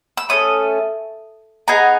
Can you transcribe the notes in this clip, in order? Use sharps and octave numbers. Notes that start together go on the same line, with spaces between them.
E6
A3 C#4 A4 D#6
B3 D#4 G#4 G#5 A#5